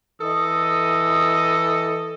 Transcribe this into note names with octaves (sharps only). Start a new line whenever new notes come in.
E3 A4 D#5 D#6